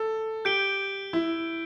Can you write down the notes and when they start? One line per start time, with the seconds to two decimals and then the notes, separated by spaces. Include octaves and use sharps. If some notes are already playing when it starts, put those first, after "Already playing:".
Already playing: A4
0.45 G4 G6 D7 G7
1.13 E4